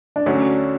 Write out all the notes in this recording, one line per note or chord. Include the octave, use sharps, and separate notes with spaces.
D4
D2 D3 F#3 A3 C#4 D4